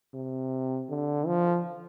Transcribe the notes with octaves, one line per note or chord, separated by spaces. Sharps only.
C3
D3
F3